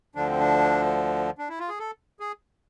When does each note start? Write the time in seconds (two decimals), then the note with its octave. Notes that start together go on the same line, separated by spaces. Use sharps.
0.15 D2 D3 F3 D4
0.28 C4
0.40 D4
1.38 D4
1.49 E4
1.60 F4
1.69 G#4
1.79 A4
2.20 G#4